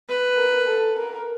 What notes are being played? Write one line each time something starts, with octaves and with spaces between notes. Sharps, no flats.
B4
A#4
A4
A#4